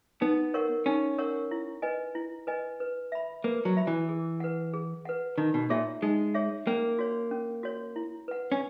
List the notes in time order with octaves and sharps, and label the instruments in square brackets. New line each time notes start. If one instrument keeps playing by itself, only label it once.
[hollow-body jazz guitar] B3 [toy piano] D#4
[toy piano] A#4 C#5 F#5 C#6
[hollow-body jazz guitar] C#4 [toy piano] D#4
[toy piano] A#4 C#5 F#5 C#6
E4
B4 D#5 G#5
E4
B4 D#5 G#5
B4
E5 B5
[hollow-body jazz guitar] A#3 [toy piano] B4
[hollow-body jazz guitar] F#3
[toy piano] E5 B5
[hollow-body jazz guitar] E3
[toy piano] G#4
B4 F#5
G#4
B4 F#5
[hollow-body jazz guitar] D#3 [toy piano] D#4
[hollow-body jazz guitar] B2
[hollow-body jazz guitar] A#2 [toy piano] G#4 C#5 E5
[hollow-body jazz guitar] G#3 [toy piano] D#4
[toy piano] G#4 C#5 E5
[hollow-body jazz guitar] A#3 [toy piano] C#4
[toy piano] F#4 C#5
C#4
F#4 C#5
E4
B4 F#5
[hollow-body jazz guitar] C#4